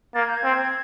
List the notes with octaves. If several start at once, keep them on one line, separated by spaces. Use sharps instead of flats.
A#3 A6
G#6
G6
G#6
C4